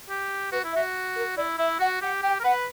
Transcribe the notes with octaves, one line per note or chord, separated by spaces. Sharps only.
G4
F#4 B4
E4
E5
F#4
A#4
E4 D5
E4 E5
F#4 F#5
G4 F#5
G4 G5
A#4
B4 F#5